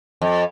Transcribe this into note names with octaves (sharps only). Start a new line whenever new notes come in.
F2